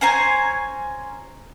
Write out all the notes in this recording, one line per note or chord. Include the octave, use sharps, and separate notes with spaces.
C#4 C5 G#5 A#5